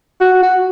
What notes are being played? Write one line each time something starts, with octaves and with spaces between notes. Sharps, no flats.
F#4
F#4